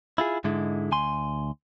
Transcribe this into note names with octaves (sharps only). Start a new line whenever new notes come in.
E4 F4 G#4
G#2 D3 G#3 E4
D2 G#5 C6